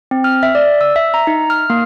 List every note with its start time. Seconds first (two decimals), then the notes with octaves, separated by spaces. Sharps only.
0.11 C4
0.24 F6
0.43 E5
0.55 D5
0.81 E6
0.96 E5
1.14 A#5
1.27 D#4
1.50 F6
1.70 A#3